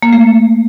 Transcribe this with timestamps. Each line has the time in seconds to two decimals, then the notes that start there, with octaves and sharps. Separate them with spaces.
0.02 A#3
0.13 A3